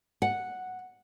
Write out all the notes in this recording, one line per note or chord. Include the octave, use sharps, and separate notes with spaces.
F#5